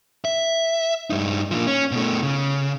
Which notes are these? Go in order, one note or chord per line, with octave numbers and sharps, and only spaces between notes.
E5
G2 D#4
A#2 F3
C#4
B2 A3
C#3